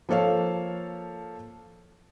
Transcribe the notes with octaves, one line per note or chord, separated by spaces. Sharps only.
F3 A#3 A4 C#5 F5